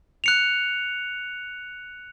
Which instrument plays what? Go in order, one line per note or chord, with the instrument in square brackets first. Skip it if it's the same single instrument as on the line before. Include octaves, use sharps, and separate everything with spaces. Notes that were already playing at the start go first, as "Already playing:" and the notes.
[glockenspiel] F#6 C#7 F7